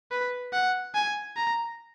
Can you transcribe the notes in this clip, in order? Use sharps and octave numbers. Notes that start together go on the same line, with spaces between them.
B4
F#5
G#5
A#5